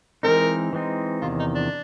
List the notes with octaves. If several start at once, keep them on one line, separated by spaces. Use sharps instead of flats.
E3 G#3 C4 D#4 A#4
E3 G#3 C4 D#4
E2 C3 D#3 F4
D#4
D4